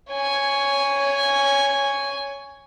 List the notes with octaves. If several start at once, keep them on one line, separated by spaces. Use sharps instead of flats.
C#5 G#5